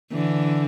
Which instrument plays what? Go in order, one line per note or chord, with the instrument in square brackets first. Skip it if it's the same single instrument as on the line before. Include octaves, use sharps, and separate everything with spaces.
[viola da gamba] D3 E3